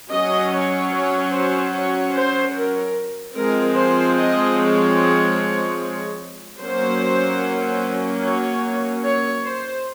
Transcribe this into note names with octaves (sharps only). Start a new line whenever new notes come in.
F#3 C#4 D#5
C#5
C#5
C5
C#5
C5
A#4
F3 G#3 C4 A#4
C5
D#5
C#5
F#3 A#3 C#4 C5
C#5
C#5
C5